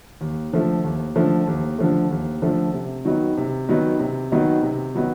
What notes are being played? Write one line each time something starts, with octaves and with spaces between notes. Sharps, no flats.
D#2
D3 F3 A3
D#2
D3 F3 A3
D#2
D3 F3 A3
D#2
D3 F3 A3
C3
D#3 F#3 B3 D#4
C3
D#3 F#3 B3 D#4
C3
D#3 F#3 B3 D#4
C3
D#3 F#3 B3 D#4